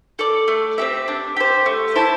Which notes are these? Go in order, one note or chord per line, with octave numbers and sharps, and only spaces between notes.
A4 D5
A3
C4 G4 E5
D4
G4 C5
A3
E4 C5 A5